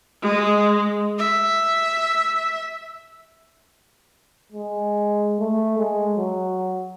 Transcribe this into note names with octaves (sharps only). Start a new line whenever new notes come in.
G#3
E5
G#3
A3
G#3
F#3